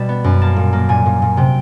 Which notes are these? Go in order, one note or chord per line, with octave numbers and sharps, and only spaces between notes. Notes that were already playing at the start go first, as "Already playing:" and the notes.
Already playing: B2 G3 A5
B3
F#2
A#3 A5
A#2
A#3
A#2 G#5
A#2
A#2
C3 G5